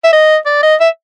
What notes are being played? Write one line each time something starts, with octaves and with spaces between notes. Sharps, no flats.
E5
D#5
D5
D#5
E5